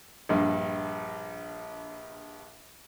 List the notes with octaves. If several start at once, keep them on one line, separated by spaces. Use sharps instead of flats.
A#1 G2